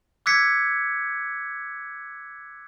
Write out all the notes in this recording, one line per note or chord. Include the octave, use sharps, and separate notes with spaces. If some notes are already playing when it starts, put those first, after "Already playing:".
D6 E6 F#6 G#6 B6 C#7